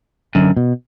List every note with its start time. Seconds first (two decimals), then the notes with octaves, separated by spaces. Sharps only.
0.35 F#2 D3
0.57 B2